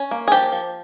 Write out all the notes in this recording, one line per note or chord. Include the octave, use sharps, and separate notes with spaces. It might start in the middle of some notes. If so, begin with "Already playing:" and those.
Already playing: C#4
A#3
G#4
F3 G4
F3